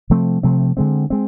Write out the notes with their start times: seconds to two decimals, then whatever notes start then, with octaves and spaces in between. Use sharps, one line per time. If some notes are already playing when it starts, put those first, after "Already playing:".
0.10 C3 F3 A3 C4
0.43 C3 F3 A3 C4
0.77 D3 G#3 C4
1.10 G#3 C4